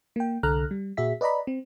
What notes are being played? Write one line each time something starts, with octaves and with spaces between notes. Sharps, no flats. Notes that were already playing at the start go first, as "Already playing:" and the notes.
A#3 G5
C2 D3 A4 A#5 F6 F#6
G3
A#2 F#4 G#4 E5 B6
B4 D5 D#5 A#5 B5
C4